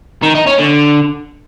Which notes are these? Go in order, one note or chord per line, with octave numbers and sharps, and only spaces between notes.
D#3
D#4
C#4
D3